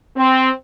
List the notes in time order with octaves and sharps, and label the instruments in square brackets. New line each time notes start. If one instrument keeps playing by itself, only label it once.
[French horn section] C4